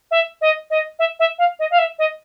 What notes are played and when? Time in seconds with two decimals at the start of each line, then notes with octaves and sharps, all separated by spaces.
0.11 E5
0.41 D#5
0.70 D#5
0.99 E5
1.20 E5
1.38 F5
1.59 D#5
1.71 F5
1.79 E5
1.99 D#5